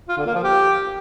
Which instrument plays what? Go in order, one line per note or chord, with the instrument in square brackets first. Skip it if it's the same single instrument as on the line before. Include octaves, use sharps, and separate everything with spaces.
[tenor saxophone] F4
D3
A#3
F3
G4